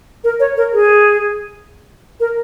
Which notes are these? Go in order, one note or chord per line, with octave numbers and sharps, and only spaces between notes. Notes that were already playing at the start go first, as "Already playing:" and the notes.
A#4
C#5
A#4
G#4
A#4